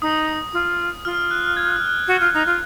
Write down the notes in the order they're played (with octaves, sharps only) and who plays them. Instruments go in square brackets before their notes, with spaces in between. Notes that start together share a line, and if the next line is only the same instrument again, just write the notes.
[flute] D#4 [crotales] D#6
[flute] F4
[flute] F4 [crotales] F6
[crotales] F#6
G#6
F#6
F6
F#6
[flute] F#4
F4
D#4
F4